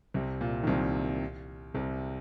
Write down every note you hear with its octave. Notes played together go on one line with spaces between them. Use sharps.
C2 C3
A#2
D#3
C2 C3
C2 C3